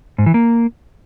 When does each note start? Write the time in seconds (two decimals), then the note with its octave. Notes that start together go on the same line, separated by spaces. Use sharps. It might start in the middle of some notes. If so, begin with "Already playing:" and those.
0.18 G#2
0.26 E3
0.34 A#3